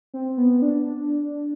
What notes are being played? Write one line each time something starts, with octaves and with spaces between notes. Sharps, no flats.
C4
B3
D4